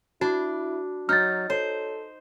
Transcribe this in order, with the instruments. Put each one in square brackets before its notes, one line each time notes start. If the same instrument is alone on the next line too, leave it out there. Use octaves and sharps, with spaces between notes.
[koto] D4 [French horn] E4 [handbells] F#4
[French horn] F#3 [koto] D#4 [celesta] F6 G6 A6
[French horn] A4 [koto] C5 [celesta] C#5